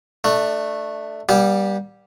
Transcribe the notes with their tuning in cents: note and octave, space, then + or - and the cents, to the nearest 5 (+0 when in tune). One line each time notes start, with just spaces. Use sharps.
A3 +0 D4 +20
G3 +0 B3 -45 G4 +0